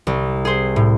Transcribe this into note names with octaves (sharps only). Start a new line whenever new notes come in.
C2
G#4 C5
A2